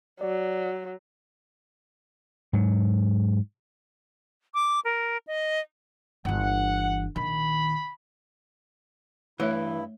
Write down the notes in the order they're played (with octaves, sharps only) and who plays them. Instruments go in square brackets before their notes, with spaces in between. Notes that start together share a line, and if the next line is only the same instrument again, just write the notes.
[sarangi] F#3 [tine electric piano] D5
[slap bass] G#2 F#3
[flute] D6
A#4
D#5
[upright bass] G1 E3 [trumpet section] F#5
[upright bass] A#1 D#3 [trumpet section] B5
[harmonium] G2 E4 [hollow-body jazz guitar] E3 [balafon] A3 C#5 E5